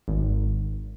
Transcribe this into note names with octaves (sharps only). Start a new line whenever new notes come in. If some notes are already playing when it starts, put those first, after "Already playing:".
G#1